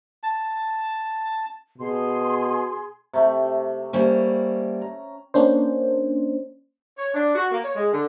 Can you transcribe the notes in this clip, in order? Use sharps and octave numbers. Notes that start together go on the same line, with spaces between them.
A5
B2 G#4 C6
C3 A3
G3 A#3 C#4 C5
A#5
A#3 C#4 D4 C5
C#5
D4
F#4
A#3
C#5
G#3
D3